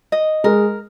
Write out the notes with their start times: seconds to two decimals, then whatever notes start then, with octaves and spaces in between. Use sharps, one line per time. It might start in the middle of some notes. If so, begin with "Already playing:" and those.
0.12 D#5
0.44 G#3 A#4